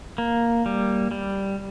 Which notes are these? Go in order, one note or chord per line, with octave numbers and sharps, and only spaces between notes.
A#3
G3
G3